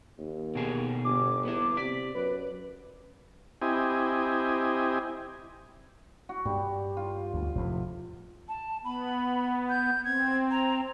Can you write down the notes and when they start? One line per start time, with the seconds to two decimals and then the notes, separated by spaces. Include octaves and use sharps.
0.18 D#2
0.55 B2 D3 G#4
1.05 G1 D6
1.45 B3 E4
1.77 C3 D5 B6
2.15 F#2 B4
3.62 C4 E4 G4 D#5 G#5
6.29 F#4
6.45 G2 G3
6.97 F4
7.34 D2
7.55 F1 E2 A2
8.48 A5
8.85 B3 B5
9.69 G6
10.05 C4 G#6
10.51 A#5